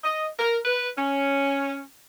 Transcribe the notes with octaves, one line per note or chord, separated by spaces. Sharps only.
D#5
A#4
B4
C#4